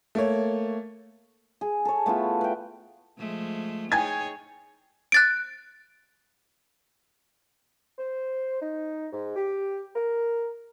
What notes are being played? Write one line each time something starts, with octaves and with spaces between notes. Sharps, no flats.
A3 A#3 C#5
G#4
A4 C#5
A3 B3 E4 F4
B4 G5
F3 G#3 A3
D#4 G#4 C#5 G5 G#5 G#6
F#6 A6 D7
C5
D#4
G#2
G4
A#4